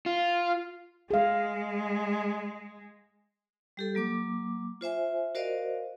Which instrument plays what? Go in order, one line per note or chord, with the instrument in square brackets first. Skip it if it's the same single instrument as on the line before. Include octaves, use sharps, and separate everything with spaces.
[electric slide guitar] F4
[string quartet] G#3 [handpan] G#4 F5
[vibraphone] G3 G4 A4
F#3 A#3 D6
F4 C5 E5 G#5
F#4 A#4 C5 D5 D#5 F5